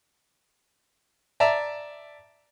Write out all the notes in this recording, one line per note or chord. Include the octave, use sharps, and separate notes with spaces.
D5 E5 A5 A#5